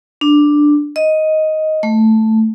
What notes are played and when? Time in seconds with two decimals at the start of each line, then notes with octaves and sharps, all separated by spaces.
0.21 D4
0.96 D#5
1.83 A3